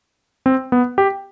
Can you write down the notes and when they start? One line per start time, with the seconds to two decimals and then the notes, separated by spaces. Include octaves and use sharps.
0.46 C4
0.72 B3
0.98 G4